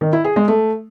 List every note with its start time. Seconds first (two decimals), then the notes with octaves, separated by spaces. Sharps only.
0.01 D#3
0.13 E4
0.24 G#4
0.36 G#3
0.48 A3